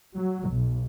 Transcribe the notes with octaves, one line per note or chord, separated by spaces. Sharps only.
F#3
B1